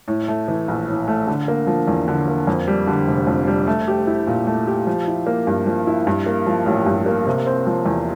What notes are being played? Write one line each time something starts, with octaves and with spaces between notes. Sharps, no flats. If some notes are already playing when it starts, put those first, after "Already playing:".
A2
A3
E3
A#1
A2
A3
D3
A#3
F3
E2
D3
A#3
F2
G3
D3
F1
F2
G3
A3
G4
E4
A#2
A3
G4
F3
E4
A#3
G2
F3
E4
G2
A#3
F3
A1
G2
A#3
C3
C4
F3
E2